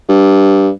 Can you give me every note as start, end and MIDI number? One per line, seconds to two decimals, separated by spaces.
0.09 0.69 43